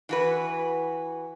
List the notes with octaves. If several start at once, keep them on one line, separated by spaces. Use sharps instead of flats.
E3 F#4 B4